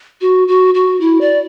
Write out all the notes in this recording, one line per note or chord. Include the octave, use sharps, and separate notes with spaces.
F#4
F#4
F#4
E4
D5